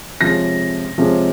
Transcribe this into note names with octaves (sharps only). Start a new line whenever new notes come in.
C3 F3 G#3 C#4 A#6
C3 F3 G#3 C#4